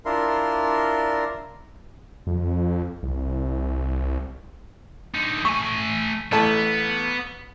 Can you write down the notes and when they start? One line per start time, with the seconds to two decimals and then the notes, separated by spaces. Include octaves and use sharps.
0.05 D4 E4 F4 A#4 C6
2.27 F2
3.03 C2
5.14 D3 D#4
5.45 A3 G#5 C#6
6.32 A1 A3 B3 A5